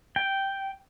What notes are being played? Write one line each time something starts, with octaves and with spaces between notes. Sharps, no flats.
G5